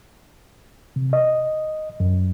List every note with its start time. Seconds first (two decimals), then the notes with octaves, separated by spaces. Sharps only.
0.96 C3
1.13 D#5
2.00 F#2